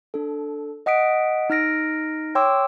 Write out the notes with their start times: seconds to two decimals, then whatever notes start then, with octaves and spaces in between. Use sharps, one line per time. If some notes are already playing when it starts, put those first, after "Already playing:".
0.14 D4 A4
0.86 D#5 F#5 D#6 B6 D7
1.50 D#4 F6 A#6 D7
2.35 C#5 G5 C6 D6 E6